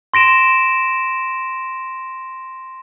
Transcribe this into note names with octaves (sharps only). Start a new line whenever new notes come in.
C6 A#6 D7 E7